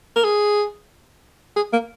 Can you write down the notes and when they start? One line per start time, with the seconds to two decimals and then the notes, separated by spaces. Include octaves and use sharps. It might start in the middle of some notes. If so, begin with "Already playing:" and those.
0.16 A#4
0.24 G#4
1.56 G#4
1.73 A#3